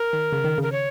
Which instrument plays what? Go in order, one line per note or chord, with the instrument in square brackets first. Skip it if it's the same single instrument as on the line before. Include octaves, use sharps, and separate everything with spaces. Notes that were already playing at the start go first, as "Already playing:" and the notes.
Already playing: [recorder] A#4
[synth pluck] D#3
C#3
D#3
[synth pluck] C#3 [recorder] A#4
[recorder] C#5